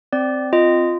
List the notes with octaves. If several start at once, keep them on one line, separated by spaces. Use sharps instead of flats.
C4 D5
F4 D#5